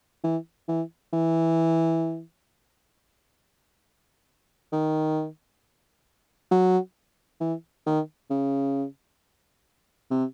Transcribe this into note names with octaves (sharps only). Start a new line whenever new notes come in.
E3
E3
E3
D#3
F#3
E3
D#3
C#3
C3